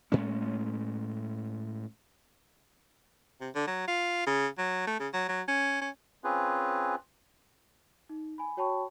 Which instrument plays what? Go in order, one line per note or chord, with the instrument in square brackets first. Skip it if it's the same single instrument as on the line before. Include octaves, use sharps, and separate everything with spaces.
[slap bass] A2 G#3 C#4
[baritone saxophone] C3
D3
F#3
F4
C#3
F#3
A3
C#3
F#3
F#3
C#4
C#4
[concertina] C4 C#4 F4 G#4 B4
[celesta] D#4
G#5 B5
F#4 C#5 G5 A5 B5 C#6